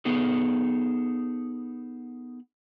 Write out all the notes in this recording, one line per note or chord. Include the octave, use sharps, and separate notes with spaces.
B3 D#4 G#4 A4